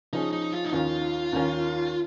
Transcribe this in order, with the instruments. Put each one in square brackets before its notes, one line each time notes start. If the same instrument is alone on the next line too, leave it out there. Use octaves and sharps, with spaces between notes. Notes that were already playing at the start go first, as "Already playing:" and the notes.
[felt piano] F3 C#4 G#4 [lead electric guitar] D#4
[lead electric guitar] D#4
F4
D#4
[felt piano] D#2 D#3 C#4 A#4 [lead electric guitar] F4
[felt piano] D#2 D#3 C#4 A#4